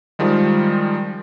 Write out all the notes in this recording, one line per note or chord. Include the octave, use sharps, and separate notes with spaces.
D#3 F3 G3 G#3